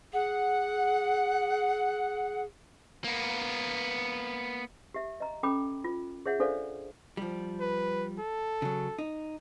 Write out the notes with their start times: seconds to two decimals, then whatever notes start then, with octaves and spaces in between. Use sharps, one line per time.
0.13 G#4 F#5
3.04 A#3 B3
4.94 G4 E5
5.20 D#5 A#5
5.43 C#4 A4 G5 B5 D6
5.84 F4
6.26 G#4 C#5 E5 F#5
6.40 D4 A4 C5 D5 F5
7.17 F3 G3
7.60 B4
8.19 A4
8.62 C#3 F#3
8.98 D#4